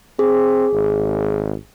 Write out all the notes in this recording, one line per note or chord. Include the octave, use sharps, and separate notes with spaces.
C4 G#4
G#1